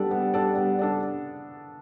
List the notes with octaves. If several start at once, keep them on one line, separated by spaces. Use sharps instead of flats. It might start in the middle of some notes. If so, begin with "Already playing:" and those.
Already playing: G3 B3 D4 A4 D5
B3
D4 A4 D5
B3
D4 A4 D5